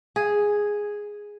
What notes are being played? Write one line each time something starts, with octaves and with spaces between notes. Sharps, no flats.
G#4